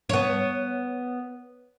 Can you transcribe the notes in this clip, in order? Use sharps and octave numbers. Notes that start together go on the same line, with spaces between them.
B3 C#5